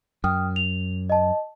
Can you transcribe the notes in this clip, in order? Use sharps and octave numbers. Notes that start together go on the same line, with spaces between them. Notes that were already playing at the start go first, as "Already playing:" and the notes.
F#2 G5 D#6 F6
F7
D#5 A5